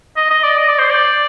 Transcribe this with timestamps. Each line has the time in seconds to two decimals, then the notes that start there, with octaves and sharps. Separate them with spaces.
0.17 D#5
0.31 D#5
0.44 D5
0.58 D#5
0.69 D5
0.79 C5
0.90 D5